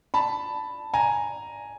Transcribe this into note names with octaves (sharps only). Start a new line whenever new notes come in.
A5 B5
G#5 A#5